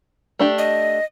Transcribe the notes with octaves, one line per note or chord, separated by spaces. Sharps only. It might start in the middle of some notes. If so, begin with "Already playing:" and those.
A3 D4 G4
D#5